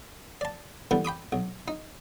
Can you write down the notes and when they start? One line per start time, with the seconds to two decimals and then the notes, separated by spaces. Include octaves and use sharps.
0.41 D5 A5
0.91 D3 E3 G3 B3
1.05 G5 B5 D6 D#6
1.32 B1
1.68 D#4